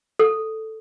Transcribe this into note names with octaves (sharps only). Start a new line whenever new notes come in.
A4